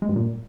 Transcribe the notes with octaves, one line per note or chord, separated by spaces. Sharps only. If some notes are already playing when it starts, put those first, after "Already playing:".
G#3
G2
A#2